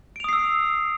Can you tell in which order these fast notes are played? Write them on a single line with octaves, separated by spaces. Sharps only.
D7 F7 D#6 C7 E6